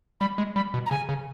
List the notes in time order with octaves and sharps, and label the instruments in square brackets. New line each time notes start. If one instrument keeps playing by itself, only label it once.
[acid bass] G3 [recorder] B5
[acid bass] G#3
[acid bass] G3 [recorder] B5
[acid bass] B2
[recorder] A#5
[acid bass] C#3 [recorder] G#5
[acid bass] C#3